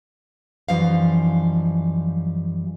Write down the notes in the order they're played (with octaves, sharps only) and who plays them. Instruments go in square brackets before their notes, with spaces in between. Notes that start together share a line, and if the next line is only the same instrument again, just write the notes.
[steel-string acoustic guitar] F#2 E3 F3 G3 D#4 F5